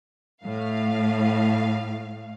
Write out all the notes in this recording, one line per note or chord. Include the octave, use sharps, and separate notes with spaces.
A2 F5